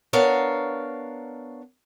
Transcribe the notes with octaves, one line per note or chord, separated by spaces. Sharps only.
B3 D4 A#4 C#5 F5